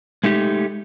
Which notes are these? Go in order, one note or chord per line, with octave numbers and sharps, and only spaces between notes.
G#3 A3 D#4 G4